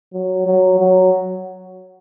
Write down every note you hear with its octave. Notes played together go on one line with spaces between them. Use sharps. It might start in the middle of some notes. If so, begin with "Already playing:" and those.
F#3
F#3
F#3